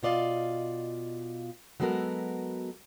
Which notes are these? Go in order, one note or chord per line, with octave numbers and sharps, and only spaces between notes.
B2 F4 D5 D#5 F5
F#3 G#3 B3 F#4 A4 A#4